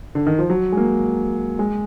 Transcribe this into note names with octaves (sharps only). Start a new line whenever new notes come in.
D3
D#3
F3
F#3
G#3
A#3
G#3